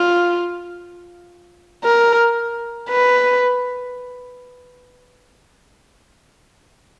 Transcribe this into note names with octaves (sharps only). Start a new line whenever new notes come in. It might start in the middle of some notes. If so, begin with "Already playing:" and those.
Already playing: F4
A#4
B4